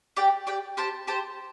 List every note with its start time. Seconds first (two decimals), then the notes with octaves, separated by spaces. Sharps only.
0.16 G4 D5 G5
0.47 G4 D5 G5
0.77 G4 C5 A5
1.07 G4 C5 A5